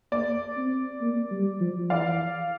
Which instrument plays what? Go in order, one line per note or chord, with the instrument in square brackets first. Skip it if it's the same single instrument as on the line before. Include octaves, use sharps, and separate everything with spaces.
[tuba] A#3 [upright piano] D5
[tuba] C4
A#3
G3
F3
[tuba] E3 [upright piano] D5 F5